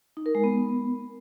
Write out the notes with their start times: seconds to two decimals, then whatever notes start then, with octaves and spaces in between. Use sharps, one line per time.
0.17 D#4
0.26 A#4
0.35 G#3
0.44 B3